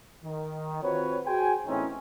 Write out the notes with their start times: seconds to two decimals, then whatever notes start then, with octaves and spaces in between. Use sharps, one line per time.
0.25 D#3
0.83 C4 F4 F#4 B4 C#5
1.26 F#4 G#4 C5 G5 G#5
1.67 E2 A2 C4 C#4 D#4 C#5